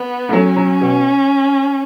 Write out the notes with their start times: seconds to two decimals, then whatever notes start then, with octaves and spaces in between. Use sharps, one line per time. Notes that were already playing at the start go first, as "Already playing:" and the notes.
Already playing: B3
0.29 A3
0.33 F#3 C#4
0.56 F#3
0.81 B2